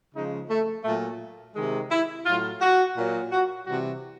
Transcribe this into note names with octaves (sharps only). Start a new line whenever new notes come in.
C#3 F3 G#3 D#4
A3
A#2 F#3 A3
C3 D#3 G#3
E4
A2 F#3 F4
F#4
A#2 F#3
F#4
C3 E3 G3 F#4